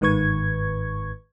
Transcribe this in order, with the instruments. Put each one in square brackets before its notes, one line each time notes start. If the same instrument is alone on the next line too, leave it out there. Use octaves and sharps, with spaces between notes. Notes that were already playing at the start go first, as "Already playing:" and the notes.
[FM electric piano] G1 G#2 D#3 B4 C#6 G#6